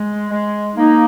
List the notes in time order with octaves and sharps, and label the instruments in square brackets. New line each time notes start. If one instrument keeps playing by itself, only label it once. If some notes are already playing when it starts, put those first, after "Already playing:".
Already playing: [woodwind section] G#3
G#3
[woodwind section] A#3 [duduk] D#4